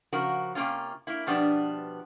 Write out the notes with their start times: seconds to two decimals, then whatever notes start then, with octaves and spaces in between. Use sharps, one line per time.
0.13 C#3 F3 F#4 A#4
0.55 C3 D#3 A#3 C#4 F4
1.07 A#3 E4
1.26 B2 F3 G3 B3 D4